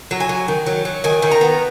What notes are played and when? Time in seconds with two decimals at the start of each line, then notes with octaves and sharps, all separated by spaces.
0.11 F#3
0.20 G#5
0.29 F#3
0.48 D#3
0.66 F#3
0.85 F#3
1.04 D#3 G#5
1.22 D#3
1.31 A#5
1.41 B3